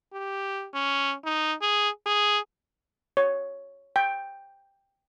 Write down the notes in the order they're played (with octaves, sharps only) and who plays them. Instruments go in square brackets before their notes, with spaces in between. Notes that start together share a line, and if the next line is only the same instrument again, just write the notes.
[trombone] G4
C#4
D#4
G#4
G#4
[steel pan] C#5
G5